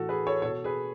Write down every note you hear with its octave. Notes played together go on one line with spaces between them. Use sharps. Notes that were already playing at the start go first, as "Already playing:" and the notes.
Already playing: A2 E3 F#4 A4
G#4 B4
A4 C#5
B2 A4 C#5
G#4 B4